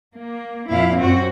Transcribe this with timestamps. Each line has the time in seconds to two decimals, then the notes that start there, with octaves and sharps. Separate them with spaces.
0.17 A#3
0.70 F2 A#2 E4 F5
0.98 F#2 C4 F#4